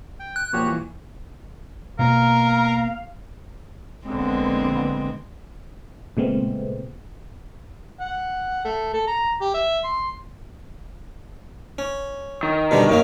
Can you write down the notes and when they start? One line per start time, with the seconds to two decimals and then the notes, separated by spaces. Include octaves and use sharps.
0.20 G5
0.36 F#6
0.53 A#2 F3 F#4 G4 C#5
0.67 E3
1.99 B2 A#3 A#4 F5 A#5
4.07 A#1 D3 G#3 B3 C4
6.17 A#2 C#3 G#3 A3 B3 C4
8.00 F#5
8.64 A3
8.94 A4
9.07 A#5
9.41 G4
9.54 E5
9.84 C6
11.79 C#4
12.43 D#3
12.71 B2 D3 G3
12.89 F#2 A#3 C#4